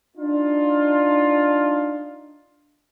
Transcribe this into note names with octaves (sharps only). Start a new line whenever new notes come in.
D4 D#4 F4